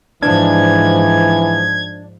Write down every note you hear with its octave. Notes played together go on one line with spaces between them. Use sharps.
G#2 E3 F3 D4 G#6